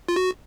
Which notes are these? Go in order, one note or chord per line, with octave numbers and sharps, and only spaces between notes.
F4
F#4